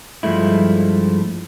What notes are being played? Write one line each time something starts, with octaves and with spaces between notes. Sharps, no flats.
G2 F3 G#3 A3 E4